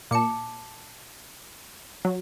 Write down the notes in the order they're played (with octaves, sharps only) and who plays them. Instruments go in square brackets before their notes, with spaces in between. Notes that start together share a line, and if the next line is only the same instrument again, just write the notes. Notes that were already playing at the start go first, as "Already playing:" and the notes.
[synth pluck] A#2 C#7 [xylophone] A5 D6
[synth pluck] F#3